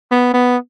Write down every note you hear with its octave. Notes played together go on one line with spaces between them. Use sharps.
B3
B3